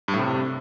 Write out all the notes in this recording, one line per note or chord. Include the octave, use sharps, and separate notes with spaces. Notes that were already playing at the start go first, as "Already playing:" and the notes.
G2
A2
C3